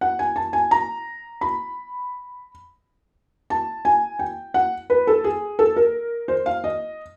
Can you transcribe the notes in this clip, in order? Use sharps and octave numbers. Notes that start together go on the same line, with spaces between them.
F#5
G#5
A5
G#5
A#5
B5
A5
G#5
G5
F#5
B4
A4
G#4
A4
A#4
C5
F5
D#5